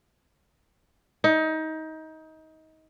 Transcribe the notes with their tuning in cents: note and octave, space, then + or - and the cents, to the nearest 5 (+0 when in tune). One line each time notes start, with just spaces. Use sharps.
D#4 +25